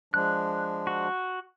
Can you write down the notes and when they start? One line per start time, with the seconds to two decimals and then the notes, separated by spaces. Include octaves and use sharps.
0.14 F3 G#3 D4 F#6
0.87 F#4